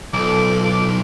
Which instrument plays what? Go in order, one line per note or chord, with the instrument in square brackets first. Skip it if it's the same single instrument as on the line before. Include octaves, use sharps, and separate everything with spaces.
[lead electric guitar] B1 [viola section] F3 A4 [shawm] D6